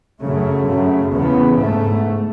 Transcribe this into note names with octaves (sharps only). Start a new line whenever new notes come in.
F#2 C#3 A3
F#2 C#3
E2 C#3 B3
G#2 A3